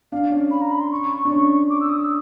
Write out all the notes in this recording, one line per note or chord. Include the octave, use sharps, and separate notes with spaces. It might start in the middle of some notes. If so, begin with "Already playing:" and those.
D4 F5
C#4
B5
A#5
B5
C6
C#6
D4
C#4
D6
E6
D#6
E6